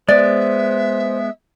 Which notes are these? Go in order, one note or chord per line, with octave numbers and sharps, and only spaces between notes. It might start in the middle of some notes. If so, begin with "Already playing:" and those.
G#3 B3 C5 D5 E5